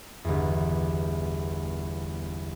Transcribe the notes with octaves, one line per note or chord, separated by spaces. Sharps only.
G1 E2